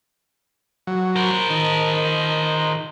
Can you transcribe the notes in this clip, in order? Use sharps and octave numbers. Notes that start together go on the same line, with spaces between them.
F#3
A#4 C5
D#3